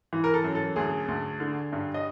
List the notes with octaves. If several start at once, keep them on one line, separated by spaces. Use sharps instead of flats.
E3
A#4
A4
F#2
A4
D2 G#4
D2
D3
G2
D#5